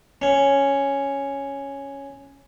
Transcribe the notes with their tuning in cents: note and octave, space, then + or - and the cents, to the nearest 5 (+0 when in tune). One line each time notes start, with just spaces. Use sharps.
C#4 +0